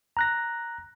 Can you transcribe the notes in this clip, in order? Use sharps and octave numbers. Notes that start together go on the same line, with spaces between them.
A#5 F#6 A#6